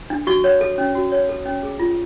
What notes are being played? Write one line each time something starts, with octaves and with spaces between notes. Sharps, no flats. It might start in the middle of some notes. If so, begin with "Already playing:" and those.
D4
F#4 C#6
C#5
A4
C#4
F#4
C#5
A4
C#4
G#4
F4